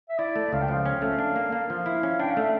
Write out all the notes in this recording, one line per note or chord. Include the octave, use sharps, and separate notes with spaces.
E5
E4 D5
A3
C#2 F5
G5
F3 F5
C#4
A3
D4
A#3
A#3 F5
F3
E4
C#4
D4 G5
F5
A3
E5